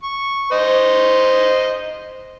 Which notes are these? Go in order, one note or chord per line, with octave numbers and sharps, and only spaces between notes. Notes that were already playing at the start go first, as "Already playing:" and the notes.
C#6
C5 D#5